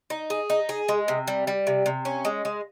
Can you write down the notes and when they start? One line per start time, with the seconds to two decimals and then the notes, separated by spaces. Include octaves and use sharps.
0.10 D#4
0.30 G#4
0.50 D#4
0.69 G#4
0.88 G#3
1.08 C3
1.27 G3
1.47 G3
1.67 C3
1.86 C3
2.05 C#4
2.25 G#3
2.45 G#3